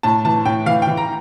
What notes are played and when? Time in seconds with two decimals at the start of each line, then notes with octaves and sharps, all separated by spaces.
0.03 A2 A5
0.25 E3 A5
0.45 A2 G5
0.66 E3 F5
0.82 G5
0.87 E3
0.97 A#5